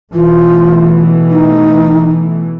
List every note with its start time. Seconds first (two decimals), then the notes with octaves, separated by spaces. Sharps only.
0.14 B2 E3 A3 F4
1.30 D#4